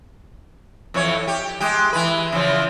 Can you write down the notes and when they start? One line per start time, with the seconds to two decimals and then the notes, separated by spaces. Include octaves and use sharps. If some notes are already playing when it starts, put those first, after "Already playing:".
0.94 F2 E3 C#5
1.27 G4
1.60 G#3 G4
1.93 E3 B4
2.32 C#3 E3 F3